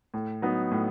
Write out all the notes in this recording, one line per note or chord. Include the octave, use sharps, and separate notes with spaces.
A2
F#3 B3 D#4
A2